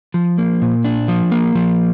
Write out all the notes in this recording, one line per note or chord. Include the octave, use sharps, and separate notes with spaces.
F3
A#3
A#2
D4
F3
A#3
F3